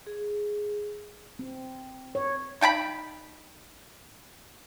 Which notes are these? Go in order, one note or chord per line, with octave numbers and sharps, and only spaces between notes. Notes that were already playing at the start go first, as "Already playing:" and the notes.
G#4
C4
C#5
D#4 G5 A5 B5